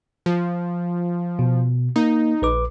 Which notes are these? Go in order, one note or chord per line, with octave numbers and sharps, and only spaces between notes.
F3
B2
A#3 D#4
A#1 B4 D6